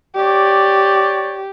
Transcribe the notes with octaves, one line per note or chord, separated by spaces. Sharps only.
G4 C#5 D5